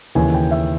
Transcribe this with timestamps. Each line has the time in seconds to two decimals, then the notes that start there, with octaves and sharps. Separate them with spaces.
0.15 D#2 C#3 E3 G#5
0.34 G5
0.51 E5